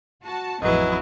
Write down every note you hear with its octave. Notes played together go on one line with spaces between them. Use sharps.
F#4 A5
A1 F2 F#3 E4 G#4 B4 D#5